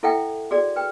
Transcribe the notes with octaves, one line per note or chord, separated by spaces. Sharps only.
E4 A4 E5 F#5 G5
F#4 G#4 D5
B4 G5